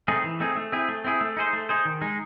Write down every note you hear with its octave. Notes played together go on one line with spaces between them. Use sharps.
A3 C4 D#4 G#4
E3
A3 C4 D#4 G#4
A3
C4 E4 G#4
A3
C4 E4 G#4
A3
D#4 G#4 C5
A3
D#4 G#4 C5
D#3
G#3 D#4